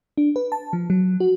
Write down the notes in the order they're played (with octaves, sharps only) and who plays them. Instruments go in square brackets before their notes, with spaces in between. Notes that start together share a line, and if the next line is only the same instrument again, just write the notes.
[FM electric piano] D4
B4
A5
F3
F#3
F#4